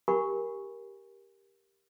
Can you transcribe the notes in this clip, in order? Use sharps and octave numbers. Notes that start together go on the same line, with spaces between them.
G4 A#4 F#5 G#5 B5 C#6